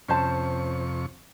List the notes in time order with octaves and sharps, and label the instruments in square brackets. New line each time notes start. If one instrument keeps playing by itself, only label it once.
[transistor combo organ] F2 C3 C#6 [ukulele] C#4 C5 A5